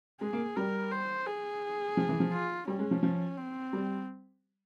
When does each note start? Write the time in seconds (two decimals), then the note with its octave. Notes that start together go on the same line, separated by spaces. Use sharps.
0.21 G#3 G#4
0.33 A#3
0.56 G3 A#4
0.91 C5
1.27 G#4
1.97 F3
2.09 E3
2.20 F3
2.32 F4
2.68 G3 C#4
2.79 G#3
2.91 F3
3.03 F3
3.37 C4
3.73 G3